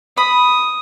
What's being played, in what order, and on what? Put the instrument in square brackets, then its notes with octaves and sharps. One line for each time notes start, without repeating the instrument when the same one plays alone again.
[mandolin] B5 [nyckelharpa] D#6